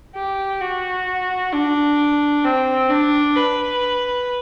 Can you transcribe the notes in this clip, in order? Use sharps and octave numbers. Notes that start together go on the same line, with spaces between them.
G4
F#4
D4
C4
D4
B4